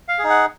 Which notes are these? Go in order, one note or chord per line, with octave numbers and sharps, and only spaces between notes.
F5
G#4
D#4
F#5